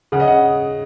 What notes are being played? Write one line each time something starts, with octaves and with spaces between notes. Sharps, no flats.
C#3 F#5
D#5
F#5